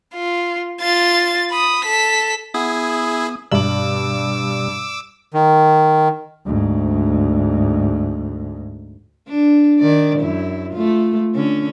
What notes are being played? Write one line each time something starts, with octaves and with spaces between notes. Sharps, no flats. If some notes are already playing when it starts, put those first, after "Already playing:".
F4
F4 A6
B5 D#6
A4 B6
B3 E4 G#4 D#6
G2 B2 G3 D6 E6 F#7
D#3
D2 G#2
D4
D#3 D5
F#2 E4
A3 F4
D3 C#4